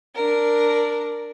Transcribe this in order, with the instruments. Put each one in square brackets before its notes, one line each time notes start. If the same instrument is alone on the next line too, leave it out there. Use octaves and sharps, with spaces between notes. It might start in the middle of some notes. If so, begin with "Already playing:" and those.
[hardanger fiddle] D4 A#4